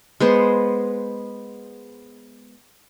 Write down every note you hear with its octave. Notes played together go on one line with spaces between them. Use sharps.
G#3 B3 C5